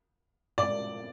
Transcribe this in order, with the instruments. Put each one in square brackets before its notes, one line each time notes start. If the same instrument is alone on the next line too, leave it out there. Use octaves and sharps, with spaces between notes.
[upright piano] D5